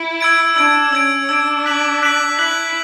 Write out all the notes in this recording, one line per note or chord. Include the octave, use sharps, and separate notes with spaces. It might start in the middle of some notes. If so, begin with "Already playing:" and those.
Already playing: E4
E6 G#6 D7
D4 E6 G#6 D7
C#4 E6 G#6 D7
D4 E6 G#6 D7
F#6 B6 F#7
F#6 B6 F#7
E4 F#6 B6 F#7